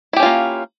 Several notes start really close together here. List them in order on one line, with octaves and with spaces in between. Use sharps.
E4 G4 C#4 F4 A#3